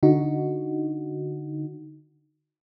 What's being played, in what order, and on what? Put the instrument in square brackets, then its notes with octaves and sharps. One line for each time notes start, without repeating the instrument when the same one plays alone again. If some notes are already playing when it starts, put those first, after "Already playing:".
[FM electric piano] D3 D#4 F#4